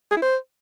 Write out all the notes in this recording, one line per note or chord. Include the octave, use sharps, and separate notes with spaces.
G#4
E4
C5